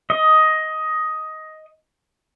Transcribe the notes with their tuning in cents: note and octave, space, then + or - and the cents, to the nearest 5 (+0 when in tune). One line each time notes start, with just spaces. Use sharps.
D#5 +10